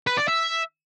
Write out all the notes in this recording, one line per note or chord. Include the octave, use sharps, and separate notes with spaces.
B4
D5
E5